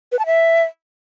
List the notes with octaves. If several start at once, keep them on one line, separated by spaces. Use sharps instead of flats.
B4
A5
E5